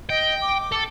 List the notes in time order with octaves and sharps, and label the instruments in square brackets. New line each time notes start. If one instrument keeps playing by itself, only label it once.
[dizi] D#5 [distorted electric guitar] G5
[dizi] D6
[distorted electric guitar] A4